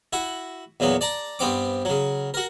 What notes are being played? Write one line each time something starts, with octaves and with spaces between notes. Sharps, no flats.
E4 F#4
E2 A#2 F#3 B3
D5 A5 A#5
G2 B3 C4 D6
C#3 F#3
F#4 A#4